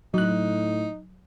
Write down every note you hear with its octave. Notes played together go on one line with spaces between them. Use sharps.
A2 F#3 D#4 F#6